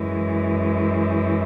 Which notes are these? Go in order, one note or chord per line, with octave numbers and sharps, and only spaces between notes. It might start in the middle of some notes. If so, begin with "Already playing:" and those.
Already playing: F#2 E3 G#3